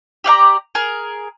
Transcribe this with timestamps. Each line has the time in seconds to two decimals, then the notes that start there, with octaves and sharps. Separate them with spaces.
0.24 G4 D5 F5 A#5
0.75 G#4 A#4